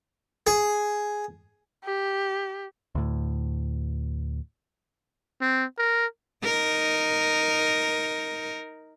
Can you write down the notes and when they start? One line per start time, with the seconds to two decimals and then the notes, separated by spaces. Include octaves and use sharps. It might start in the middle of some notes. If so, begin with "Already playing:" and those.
0.47 G#4
1.84 G4
2.95 D2 A2
5.41 C4
5.79 A#4
6.44 D#4 A#4